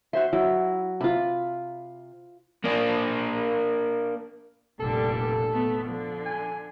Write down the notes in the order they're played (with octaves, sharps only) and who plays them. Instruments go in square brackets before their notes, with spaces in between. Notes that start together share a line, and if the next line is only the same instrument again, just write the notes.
[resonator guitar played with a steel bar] F#4 C5 E5 [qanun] C6
[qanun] F#3 [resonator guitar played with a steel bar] E4
[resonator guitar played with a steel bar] C3 [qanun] F4 B5
[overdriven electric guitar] A#3 D4
[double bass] F1 A#2 [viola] D3 G3 [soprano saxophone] A4
[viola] A3 B3
[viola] D3 [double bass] F3
[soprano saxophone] G#5